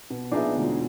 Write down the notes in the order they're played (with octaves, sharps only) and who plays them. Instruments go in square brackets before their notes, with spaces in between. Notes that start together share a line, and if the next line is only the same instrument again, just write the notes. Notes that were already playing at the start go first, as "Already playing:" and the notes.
[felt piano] B2
[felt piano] A#1 B3 E5 [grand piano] D4 D#4 G#4
[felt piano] E1 D2 A#2